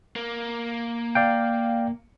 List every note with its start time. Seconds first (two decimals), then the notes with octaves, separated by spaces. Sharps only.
0.16 A#3
1.15 D5 F5 G5